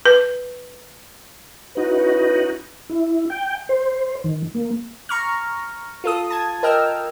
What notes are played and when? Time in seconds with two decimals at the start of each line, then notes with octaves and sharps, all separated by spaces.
0.06 B4
1.77 C#4 D#4 E4 F#4 B4
2.90 E4
3.30 G5
3.69 C5
4.24 D#3
4.55 A#3
5.09 A#5 C#6 F6
6.04 F4 A4 D#6
6.30 A5 G#6
6.63 A#4 D#5 G5 E6 F6